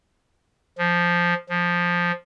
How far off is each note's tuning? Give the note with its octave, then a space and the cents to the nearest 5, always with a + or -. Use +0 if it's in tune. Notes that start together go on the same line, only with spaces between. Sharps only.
F3 +0
F3 +5